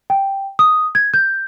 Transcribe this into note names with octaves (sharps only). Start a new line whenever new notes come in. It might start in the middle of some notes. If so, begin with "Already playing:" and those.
G5
D#6
G#6
G6